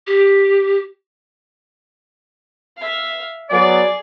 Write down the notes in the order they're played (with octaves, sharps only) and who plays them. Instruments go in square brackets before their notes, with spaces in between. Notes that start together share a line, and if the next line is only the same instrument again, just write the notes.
[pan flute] G4
[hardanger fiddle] E5 F5
[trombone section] F#3 B3 [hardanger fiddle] G#4 [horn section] D5